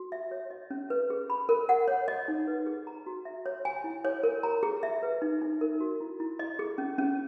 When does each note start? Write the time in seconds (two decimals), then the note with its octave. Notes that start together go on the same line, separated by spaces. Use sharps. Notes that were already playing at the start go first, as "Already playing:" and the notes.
Already playing: F#4
0.12 E5
0.31 C#5
0.50 D#5
0.70 C#4
0.90 B4
1.10 G#4
1.30 B5
1.49 A#4
1.69 F#5
1.88 C#5
2.08 D#5
2.28 D#4
2.47 B4
2.66 G#4
2.87 A#5
3.06 F#4
3.25 E5
3.46 C#5
3.65 G#5
3.84 E4
4.05 C#5
4.23 A#4
4.43 A#5
4.63 G#4
4.83 E5
5.03 B4
5.22 D#4
5.42 D#4
5.61 A#4
5.80 F#4
6.00 E4
6.20 E4
6.39 D#5
6.59 G#4
6.78 C#4
6.98 C#4